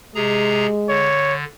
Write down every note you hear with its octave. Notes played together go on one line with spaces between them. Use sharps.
C3 G#3 G#4 A#5
D3 C#5